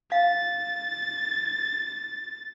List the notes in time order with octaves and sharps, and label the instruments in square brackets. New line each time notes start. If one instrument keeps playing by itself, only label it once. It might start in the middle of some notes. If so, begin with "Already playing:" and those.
[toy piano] F5 [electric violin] A6